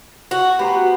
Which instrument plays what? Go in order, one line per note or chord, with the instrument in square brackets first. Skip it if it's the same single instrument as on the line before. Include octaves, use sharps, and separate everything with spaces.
[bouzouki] F#4
[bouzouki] B3 [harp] G4 C5 A#5
[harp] F#4